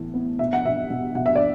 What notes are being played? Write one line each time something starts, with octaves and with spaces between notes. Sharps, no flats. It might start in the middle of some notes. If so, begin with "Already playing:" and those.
Already playing: A2 E3 B3
B3
B2 E5
F#5
B2 E5
B2
B2 F#5
E5
D5